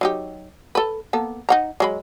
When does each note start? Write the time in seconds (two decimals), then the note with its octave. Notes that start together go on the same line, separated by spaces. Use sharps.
0.01 F#3 D#4 G4
0.75 A4 B4
1.13 A#3 B3 A4
1.49 D#4 F#5 A#5
1.80 F#3 G#3 B5